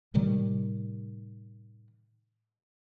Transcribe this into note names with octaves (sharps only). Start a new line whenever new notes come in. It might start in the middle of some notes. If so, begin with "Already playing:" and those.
A2 C3 D#3 G3